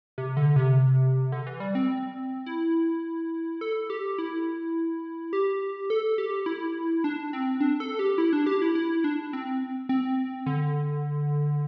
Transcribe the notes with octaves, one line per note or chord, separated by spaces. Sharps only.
C3
D3
C3
D3
E3
G3
C4
E4
A4
G4
E4
G4
A4
G4
E4
D4
C4
D4
A4
G4
E4
D4
G4
E4
E4
D4
C4
C4
D3